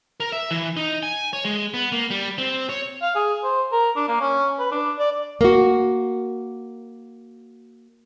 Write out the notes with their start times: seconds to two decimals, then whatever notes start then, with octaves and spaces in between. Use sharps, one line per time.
0.20 A#4
0.32 E5
0.51 E3
0.77 D#4
1.03 G#5
1.33 C#5
1.45 G#3
1.74 B3
1.92 A#3
2.10 G3
2.38 C4
2.69 C#5
3.02 F5
3.15 G#4
3.44 C5
3.72 A#4
3.97 D4
4.08 A#3
4.21 C#4
4.59 B4
4.72 D4
4.99 D5
5.41 A#3 F#4